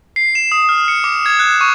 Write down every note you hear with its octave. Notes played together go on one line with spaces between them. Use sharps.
C7
E7
D#6
F6
C#7
D6
G#6
F#6
C#6